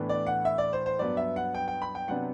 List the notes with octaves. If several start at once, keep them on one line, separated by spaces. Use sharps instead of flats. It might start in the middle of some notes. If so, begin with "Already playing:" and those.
Already playing: A2 E3 B3 D4
D5
F#5
E5
D5
C5
C5
G2 F#3 B3 D5
E5
F#5
G5
G5
B5
G5
C3 F#3 B3 D4 F#5